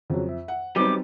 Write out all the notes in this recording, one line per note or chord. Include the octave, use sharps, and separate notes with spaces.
F2 C#3 F#3
E5
F#5
F#3 G3 B3 C4 D#4 G4 B4 D6